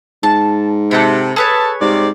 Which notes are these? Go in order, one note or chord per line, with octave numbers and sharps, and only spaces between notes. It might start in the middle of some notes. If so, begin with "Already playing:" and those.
G#2 A5
C3 A4 F#5 B5
G#4 A4 B4 C#5 A5
G#2 C3 G3 D5